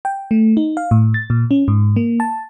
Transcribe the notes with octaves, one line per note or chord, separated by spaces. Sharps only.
G5
A3
D#4
F5
A2
A6
A#2
C#4
G#2
A#3
A5